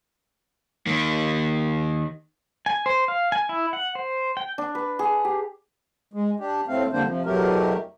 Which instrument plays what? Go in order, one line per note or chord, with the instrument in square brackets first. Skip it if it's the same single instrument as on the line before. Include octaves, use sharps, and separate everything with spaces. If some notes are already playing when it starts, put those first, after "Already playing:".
[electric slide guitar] D#3 A#3
[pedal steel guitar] G#5
C5
F5
G#5
E4
F#5
C5
G5
[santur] D4
B4
G#4
G4
[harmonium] G#3
D4 G4
A2 A3 C4 F5
F2 D3 G3 A#3 D4 C5
C3 F3
E2 B2 F#3 A3 G4 A#4